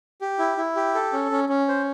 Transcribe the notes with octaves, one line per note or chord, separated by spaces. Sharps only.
G4
E4
E4
G4
A4
C#4
C#4
C#4
C5